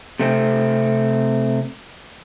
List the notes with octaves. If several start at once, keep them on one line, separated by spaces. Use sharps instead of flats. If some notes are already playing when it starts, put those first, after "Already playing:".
C3 A3 C4